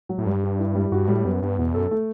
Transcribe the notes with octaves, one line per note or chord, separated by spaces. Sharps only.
F#3
A2
G2 G3
G4
E4
G3
G2 F#4
A2 G3
F#2 B3
G2 B3
E2 B2
F#2 A4
A3